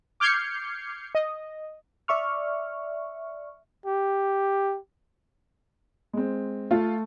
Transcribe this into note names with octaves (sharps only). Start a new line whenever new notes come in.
D6 F6 G6 G#6 C7 C#7
D#5
D5 E5 C#6 F6
G4
G#3 C4
A3 F4